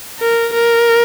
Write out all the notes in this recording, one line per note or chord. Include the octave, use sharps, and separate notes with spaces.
A#4
A#4